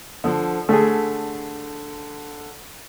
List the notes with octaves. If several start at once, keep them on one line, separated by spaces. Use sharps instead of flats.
D3 F3
D3 A3 G#4